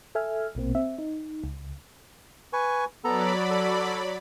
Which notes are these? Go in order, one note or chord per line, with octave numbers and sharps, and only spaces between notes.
A4 E5 G#5 F6
A#1 B2 A#3 C4
C4 E5
D#4
C#2
B4 G#5 C#6
F#3 B3 A4 D5 A#5 B5
A4